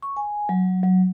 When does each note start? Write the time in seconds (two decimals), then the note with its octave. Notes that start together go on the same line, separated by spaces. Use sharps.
0.02 C#6
0.17 G#5
0.49 F#3
0.83 F#3